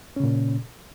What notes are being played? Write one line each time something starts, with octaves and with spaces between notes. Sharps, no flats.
A#2 C#3 C#4